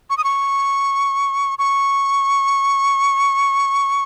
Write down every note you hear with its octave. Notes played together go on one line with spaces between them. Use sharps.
C#6
D#6
C#6
C#6